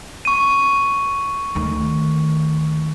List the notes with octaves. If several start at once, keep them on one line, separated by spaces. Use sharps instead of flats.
C#6 D#7
D2 D#3